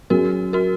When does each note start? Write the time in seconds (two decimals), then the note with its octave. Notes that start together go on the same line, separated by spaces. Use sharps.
0.10 F#3 C#4 F#4 G#4 A#4
0.53 F#4 A#4